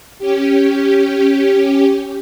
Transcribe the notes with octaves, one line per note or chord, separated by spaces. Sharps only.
C#4 G4